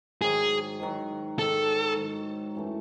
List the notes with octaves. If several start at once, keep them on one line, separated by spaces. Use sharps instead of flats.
G#2 D#3 F#3 G#4
G#2 D#3 F#3
G#2 D#3 F#3 A4
G#2 D#3 F#3
F#2 E3 A3